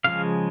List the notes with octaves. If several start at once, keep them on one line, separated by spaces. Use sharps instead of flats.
C#3 F3 G#3 F5